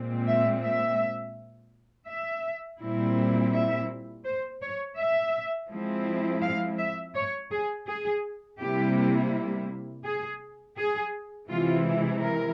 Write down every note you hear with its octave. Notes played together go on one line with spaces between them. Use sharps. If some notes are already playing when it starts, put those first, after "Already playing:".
Already playing: A#2 G#3 C4
E5
E5
E5
A#2 G3 C4 E4
E5
C5
C#5
E5
F3 G#3 C4 E4
F5
E5
C#5
G#4
G#4
C3 G3 A#3 E4 G4
G#4
G#4
C3 E3 G#3 E4 F4
A#4